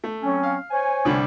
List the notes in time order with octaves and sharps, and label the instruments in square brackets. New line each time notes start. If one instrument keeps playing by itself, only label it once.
[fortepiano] A3
[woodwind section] F#3 C4 C#4
[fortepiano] F5
[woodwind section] C5 C#5 G#5
[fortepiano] C2 D3 G3